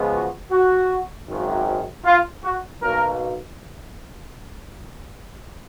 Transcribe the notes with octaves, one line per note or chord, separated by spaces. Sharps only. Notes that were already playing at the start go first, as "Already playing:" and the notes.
Already playing: C#2 C#3 F3 G#3 B3
F#4
F#4
G#1 F#2 D#3
F4
F#4
B1 B2 F#3 A#3 A#4